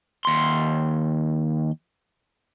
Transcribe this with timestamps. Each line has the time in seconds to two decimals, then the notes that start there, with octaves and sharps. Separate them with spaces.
0.25 D#2 C6